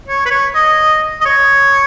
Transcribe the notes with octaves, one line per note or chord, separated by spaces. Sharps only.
C#5
B4
C#5
D#5
D#5
C#5